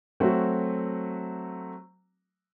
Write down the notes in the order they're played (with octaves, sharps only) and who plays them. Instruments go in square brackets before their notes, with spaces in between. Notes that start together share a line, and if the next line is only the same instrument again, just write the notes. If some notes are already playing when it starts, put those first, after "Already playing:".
[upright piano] F#3 A3 C4 F#4